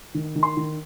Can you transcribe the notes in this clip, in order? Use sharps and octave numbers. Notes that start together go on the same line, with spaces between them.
D#3
D#3
C6
D#3